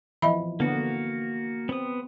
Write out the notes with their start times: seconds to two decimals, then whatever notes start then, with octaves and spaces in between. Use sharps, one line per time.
0.22 E3 F3 D#5 E5 B5
0.60 D3 A#3 B3 F#4
1.69 B3 C4 D#6